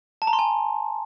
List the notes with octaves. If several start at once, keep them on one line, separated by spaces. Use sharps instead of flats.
A5
A#5
C6
G#5